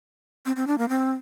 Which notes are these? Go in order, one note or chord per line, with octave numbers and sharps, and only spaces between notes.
C4
C4
D4
A#3
C4